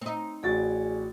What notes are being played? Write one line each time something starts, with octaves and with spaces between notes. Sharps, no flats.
C4 D#4
A1 F#4 G#4 D5 G#5 A6